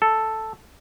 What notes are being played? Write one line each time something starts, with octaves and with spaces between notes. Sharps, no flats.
A4